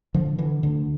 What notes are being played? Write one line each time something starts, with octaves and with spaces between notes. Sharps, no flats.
D3 F3
D3 E3
D2 D3